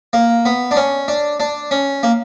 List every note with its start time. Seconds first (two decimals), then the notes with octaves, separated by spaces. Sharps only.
0.13 A#3
0.45 B3
0.71 D4
0.76 C#4
1.08 D4
1.40 D4
1.71 C#4
2.03 A#3